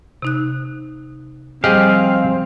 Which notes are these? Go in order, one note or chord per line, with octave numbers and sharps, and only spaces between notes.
C3 D#4 F#6
F3 G3 C4 G4 G#4 D#5 F5 G6